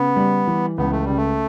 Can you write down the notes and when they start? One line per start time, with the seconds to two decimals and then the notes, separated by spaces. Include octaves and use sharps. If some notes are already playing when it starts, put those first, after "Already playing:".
Already playing: C#3 B3
0.16 G3
0.48 E3
0.78 C#2 B3
0.92 A3
1.04 C#3 G3
1.17 A3